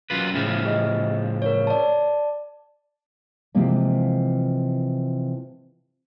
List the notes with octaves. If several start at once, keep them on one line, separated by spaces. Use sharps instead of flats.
F#2 F4 B4
A2 C#3 F3
G4 D#5
A#4 C#5
D5 A5
C3 E3 F3 G#3 A#3